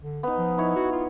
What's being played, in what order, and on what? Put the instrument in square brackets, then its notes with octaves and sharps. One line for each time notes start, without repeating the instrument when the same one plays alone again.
[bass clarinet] D3
[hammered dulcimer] B3 D#4
[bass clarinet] F3
[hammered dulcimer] D#4 E4 C#5
[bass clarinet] F#4
F4